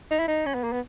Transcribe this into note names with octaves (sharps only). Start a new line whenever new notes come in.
D#4
E4
D#4
C#4
B3
A#3
B3